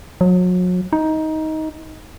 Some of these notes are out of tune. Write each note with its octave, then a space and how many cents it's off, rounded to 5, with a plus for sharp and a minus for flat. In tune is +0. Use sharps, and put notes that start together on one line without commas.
F#3 -35
D#4 +15